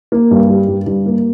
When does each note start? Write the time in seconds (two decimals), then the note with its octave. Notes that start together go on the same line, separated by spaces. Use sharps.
0.12 A#3
0.31 G2
0.49 G3
0.68 G2
0.86 G2
1.06 A#3